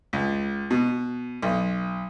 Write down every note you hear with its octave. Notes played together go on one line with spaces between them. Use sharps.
C#2
B2
B1